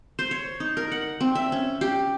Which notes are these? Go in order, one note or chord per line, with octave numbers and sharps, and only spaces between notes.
C5
C#5
D#4
A#4
F#5
C4
E5
C#4
G4